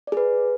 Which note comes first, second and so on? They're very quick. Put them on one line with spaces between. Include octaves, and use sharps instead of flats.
D5 G#4 B4